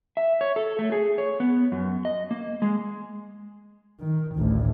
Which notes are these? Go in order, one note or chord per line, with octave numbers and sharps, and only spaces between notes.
E5
C#5
A4
A3
G#4
C#5
B3
F#2
D#5
A#3
G#3
D#3
A1 D2